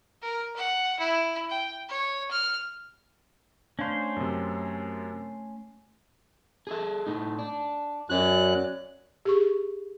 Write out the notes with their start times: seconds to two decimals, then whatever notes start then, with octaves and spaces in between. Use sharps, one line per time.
0.22 A#4
0.56 F#5
0.99 E4
1.49 G5
1.89 C#5
2.31 F6
3.79 A3 C#4 D4 C5 F5 G#5
4.16 F#2 C3
6.67 G#4 A4 E5
7.07 A2 D#4
7.39 D4
8.10 F#2 F#4 C#5 D5 F#6
9.25 G4 G#4 C#6